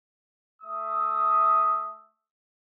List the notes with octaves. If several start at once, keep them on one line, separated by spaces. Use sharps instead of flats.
A3 E5 D#6